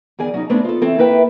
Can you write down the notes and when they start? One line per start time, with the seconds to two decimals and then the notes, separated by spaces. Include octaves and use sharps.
0.19 E2 D#3 G#4 D5 G#5
0.34 F#3 C#4 D#4
0.50 A3 B3 C4 D4 C#5 D5
0.64 F4 A4
0.82 E3 C4 A4 C#5
0.98 A#3 E4 B4 E5 G5